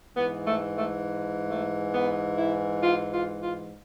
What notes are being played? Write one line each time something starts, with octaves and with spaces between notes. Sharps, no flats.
G#2 E3 B3
A3
A3
A3
B3
E4
F4
F4
F4